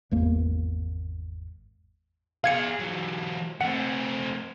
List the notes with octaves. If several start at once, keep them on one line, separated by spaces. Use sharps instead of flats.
G#1 E2 A#3
G#4 D5 F5 G#6 C#7
E3 F#3
A3 C4 F#5